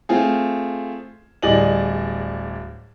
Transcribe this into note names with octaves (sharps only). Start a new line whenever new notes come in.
A3 C4 F4 G#4
D1 G3 G#4 D5 D#5 F#7